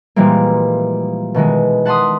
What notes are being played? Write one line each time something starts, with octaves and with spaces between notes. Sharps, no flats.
A#2 E3 F3 G3 G#3 A#3
B2 D#3 E3 G#3
F#5 A5 B5 C6 D#6